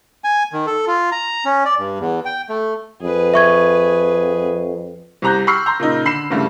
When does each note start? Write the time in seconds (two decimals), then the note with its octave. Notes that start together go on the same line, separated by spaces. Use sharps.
0.24 G#5
0.53 D#3
0.67 A4
0.87 F4
1.12 A#5
1.45 C#4
1.65 D5
1.78 G2
1.99 E2
2.25 G5
2.49 A3
3.02 F2 G#4 B4
3.34 E5 C#6 G#6
5.22 C2 C3 A#5 F#6 G6
5.47 B5 C#6 E6 F6 C7
5.66 A#5 C6 G6
5.79 A#2 C#3 D#4
6.05 D3 B5 C7 E7
6.30 C2 G2 C#3 G3 A3